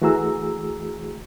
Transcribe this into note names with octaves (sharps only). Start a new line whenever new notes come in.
E3 A3 F#4 G#4 A#5 E6